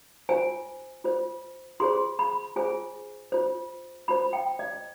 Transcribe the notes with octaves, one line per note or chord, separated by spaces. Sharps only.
F4 C5 G#5
F4 C5
F4 G#4 C5 C6
B5
F4 G#4 C5 G#5
F4 C5
F4 C5 B5
G5
D#5